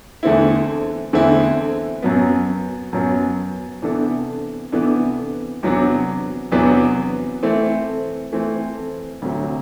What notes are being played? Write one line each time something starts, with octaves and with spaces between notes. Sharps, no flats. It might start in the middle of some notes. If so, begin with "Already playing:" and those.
E2 D3 A3 C4 E4
E2 D3 A3 C4 E4
F#2 F#3 B3
F#2 F#3 B3
C3 E3 B3 D4 A4
C3 E3 B3 D4 A4
E2 C3 F#3 B3 D4
E2 C3 F#3 B3 D4
E3 A3 C4
E3 A3 C4
D2 C3 F#3